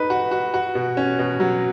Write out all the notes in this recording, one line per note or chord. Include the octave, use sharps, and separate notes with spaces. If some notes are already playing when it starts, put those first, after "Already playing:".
Already playing: D#4 B4
F#4
F#4
F#4
B2
C#4
B2
F#3